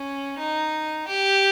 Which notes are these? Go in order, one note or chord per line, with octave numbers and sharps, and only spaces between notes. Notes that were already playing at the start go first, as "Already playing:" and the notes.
Already playing: C#4
D#4
G4